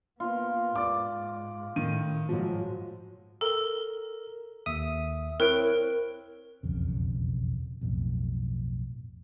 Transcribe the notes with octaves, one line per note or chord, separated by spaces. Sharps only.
A#3 B3 F4
G#2 D5 D6
A2 D#3 D#7
G#2 F3 F#3
A4 A#4 G7
D#2 E5 D#6
C4 E4 A#4 C#5 F#6 D7
E1 B1 F2 C#3
B1 F2 A2